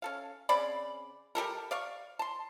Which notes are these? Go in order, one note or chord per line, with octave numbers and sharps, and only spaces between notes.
C#4 A4 F5
C#3 C4 D5 B5
G3 G4 A4 A#4
D5 F5 C#6
A5 C6